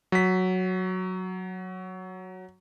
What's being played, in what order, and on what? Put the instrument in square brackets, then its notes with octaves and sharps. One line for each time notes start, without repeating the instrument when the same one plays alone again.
[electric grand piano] F#3 B6